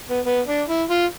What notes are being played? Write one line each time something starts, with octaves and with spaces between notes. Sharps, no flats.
B3
B3
D4
E4
F4